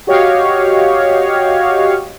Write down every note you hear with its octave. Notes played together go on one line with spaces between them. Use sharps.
F#4 G4 C#5 D#5 F5